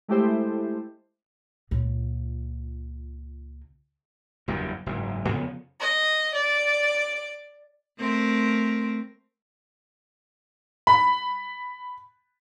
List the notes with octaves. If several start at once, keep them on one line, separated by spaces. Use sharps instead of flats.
G#3 A3 E4 G4 A4 C5
C#2 A#2
F#1 E2 G2
F#1 G#2
F2 C#3 B3
D#5
D5
A3 C4 A#4
B5